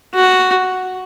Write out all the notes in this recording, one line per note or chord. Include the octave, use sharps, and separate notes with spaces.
F#4